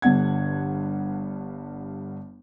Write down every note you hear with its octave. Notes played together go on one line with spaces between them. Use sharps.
G1 G2 D3 F#5 G#6